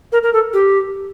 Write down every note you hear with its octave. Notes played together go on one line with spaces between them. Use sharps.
A#4
A#4
A4
G4